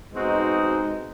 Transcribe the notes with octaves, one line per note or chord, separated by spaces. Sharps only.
B2 G#3 C4 D#4 F#4